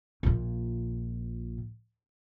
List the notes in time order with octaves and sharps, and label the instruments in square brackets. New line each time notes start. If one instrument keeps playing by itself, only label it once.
[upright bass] A#1 A#2